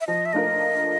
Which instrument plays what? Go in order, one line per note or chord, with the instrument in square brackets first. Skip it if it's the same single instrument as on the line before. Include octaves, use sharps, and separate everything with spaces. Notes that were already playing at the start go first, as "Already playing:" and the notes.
[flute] E5
[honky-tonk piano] F3 [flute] D#5
[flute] E5
[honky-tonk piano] A3 D4 F4 A#4 [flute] D#5